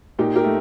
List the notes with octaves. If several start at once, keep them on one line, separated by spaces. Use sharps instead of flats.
A#2 D#4 G4
G4 A#4
A3